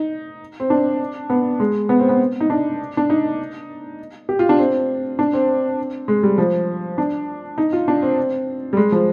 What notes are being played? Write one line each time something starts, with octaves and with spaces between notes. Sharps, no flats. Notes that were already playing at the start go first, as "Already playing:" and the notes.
Already playing: D#4
C4
D4
B3
G#3
B3
C4
B3
D#4
D4
D4
D#4
G4
F4
D4
C4
D4
C4
G#3
G3
F3
D4
D#4
F4
D4
C4
G3
G#3
F3